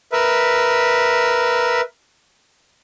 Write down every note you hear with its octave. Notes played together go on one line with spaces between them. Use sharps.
A#4 B4 E5